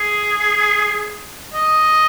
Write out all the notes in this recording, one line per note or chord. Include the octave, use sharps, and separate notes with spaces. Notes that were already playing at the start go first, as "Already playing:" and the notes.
Already playing: G#4
D#5